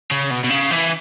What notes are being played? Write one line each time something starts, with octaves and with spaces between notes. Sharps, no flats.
C#3
B2
B2
C#3
E3